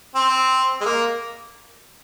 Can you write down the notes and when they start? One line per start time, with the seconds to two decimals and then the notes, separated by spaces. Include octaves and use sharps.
0.15 C4
0.81 G#3
0.86 A#3